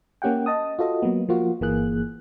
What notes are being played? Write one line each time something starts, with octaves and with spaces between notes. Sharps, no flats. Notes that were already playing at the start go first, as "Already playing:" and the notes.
A#3 C#4 G4 F#5 G5
D#5 A5 D#6
F4 F#4 A4 D#5
F#3 A#3 B3
F3 A#3 F4 F#4
G1 E3 A#3 G#4 F#6